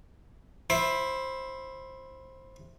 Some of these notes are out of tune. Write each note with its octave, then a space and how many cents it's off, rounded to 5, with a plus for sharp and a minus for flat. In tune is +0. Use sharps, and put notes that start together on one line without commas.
E4 +0 C5 +15